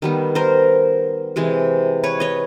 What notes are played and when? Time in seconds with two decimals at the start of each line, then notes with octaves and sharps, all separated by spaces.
0.02 D#3 G3 B3
0.35 A#4 C5
1.36 C3 E3 G#3
2.03 B4 C#5
2.20 C#5 D#5